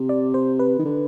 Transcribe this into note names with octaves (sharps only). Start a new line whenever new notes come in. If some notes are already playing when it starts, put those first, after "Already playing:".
Already playing: C3
D5
C5
B4
D#3
D3